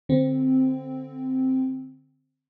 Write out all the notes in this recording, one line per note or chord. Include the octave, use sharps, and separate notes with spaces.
D3 C4